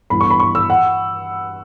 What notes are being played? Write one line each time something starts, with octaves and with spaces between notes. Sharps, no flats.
G2 E3 B3 B5
C#6
B5
C#6
E6
F#5